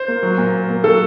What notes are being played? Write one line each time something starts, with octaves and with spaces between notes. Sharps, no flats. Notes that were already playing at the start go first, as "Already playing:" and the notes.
Already playing: C5
A#3
F#3
A#2
A#3
A#3
F#3 A4